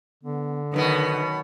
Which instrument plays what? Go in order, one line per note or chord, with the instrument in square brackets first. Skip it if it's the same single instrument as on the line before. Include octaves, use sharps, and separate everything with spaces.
[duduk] D3 [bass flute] B3
[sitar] F#2 B2 B3 [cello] D#3 [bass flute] B4